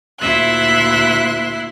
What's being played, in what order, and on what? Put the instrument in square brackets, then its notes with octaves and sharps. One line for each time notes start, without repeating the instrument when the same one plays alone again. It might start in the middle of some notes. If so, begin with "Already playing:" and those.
[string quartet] D2 A#2 E4 E5 C6 F#6